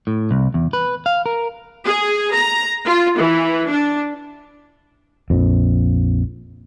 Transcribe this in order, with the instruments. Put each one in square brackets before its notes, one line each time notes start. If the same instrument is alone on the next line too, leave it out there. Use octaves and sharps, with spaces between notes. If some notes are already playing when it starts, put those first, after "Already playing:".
[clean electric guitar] A2
C2
E2
B4
F5
A#4
[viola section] G#4
A#5
F4
E3
D4
[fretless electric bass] A#1 F2